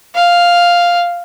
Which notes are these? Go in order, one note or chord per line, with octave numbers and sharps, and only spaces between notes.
F5